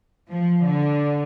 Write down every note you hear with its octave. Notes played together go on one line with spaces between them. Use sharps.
F3
D3